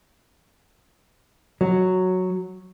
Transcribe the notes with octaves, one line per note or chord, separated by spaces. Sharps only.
F#3